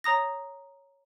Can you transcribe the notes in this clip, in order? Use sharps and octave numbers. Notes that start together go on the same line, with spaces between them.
C#5 A#5 D#6 A#6